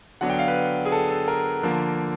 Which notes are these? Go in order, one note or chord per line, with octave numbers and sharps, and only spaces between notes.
D3 F#3 B3 D4 F#5
G5
F5
B4
G#4
A4
A4
A#4
D3 F3 A#3